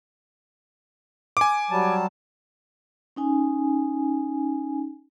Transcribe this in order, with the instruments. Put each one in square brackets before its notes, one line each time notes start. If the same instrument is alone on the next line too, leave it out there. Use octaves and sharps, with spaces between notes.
[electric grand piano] G#5 D6
[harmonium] F#3 G3 A5
[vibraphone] C#4 D#4 G#5